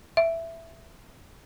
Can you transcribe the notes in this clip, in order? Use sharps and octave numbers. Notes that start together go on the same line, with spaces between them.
E5